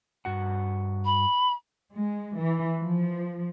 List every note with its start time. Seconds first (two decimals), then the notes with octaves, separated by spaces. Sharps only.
0.25 G2 F#4 F#5
1.05 B5
1.92 G#3
2.38 E3
2.79 F3